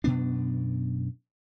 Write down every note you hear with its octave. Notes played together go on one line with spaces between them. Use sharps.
F#2 B2 B3 D4